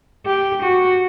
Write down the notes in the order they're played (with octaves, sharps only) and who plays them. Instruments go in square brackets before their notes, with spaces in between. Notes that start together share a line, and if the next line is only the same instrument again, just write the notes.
[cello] G4
F#4